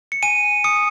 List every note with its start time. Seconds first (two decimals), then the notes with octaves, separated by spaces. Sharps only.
0.12 C#7
0.23 G#5 D#7
0.64 D#6 C#7